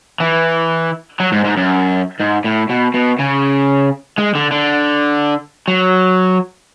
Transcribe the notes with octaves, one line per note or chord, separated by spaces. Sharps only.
E3
F#3
G#2
G#2
F#2
G#2
A2
B2
B2
C#3
G#3
D3
D3
F#3